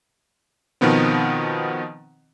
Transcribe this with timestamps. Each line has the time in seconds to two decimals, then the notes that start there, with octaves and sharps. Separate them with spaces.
0.81 B2 D#3 F3 B3 C4